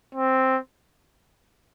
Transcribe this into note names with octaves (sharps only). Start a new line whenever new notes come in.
C4